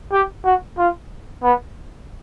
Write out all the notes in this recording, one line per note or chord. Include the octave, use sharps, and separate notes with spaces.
G4
F#4
F4
B3